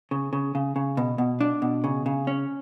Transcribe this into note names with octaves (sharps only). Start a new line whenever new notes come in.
C#3
C#3
C#3
C#3
B2
B2
D4
B2
C#3
C#3
C#4